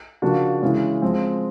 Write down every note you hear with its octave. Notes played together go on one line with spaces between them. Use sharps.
C#3 F3 A#3 D4 F#4
C#3 E3 G#3 C#4
F3 G#3 C4